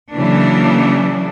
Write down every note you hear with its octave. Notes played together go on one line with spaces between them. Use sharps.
C#3 E3 F#3 A#3 D4